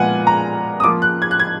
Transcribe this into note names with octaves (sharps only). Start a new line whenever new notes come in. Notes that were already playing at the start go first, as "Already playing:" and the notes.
Already playing: A#2 F3 G#3 B3 F4 F#5 G#5
A#5
D#6
F3 A#3 F4 D6
F#6
G#6
F#6
G#6